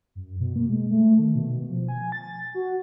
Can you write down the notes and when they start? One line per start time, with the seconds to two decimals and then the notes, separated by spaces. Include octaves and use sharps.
0.15 F#2
0.40 B2
0.56 A#3
0.69 G#3
0.91 A3
1.19 D#3
1.35 B2
1.69 F3
1.88 G#5
2.12 A6
2.54 F#4